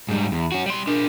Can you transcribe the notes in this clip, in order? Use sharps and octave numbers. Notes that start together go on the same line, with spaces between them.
G#2 G3
E2
C#4 F#4
G3 C6
D4 A#4